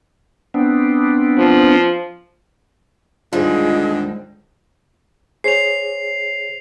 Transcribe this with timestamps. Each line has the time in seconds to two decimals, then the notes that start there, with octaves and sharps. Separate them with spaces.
0.54 B3 C4 D4
1.37 F3
3.33 D#2 G#2 D3 G3 F4 G#4 D#5
5.44 G#4 C5 C#5 C7 F7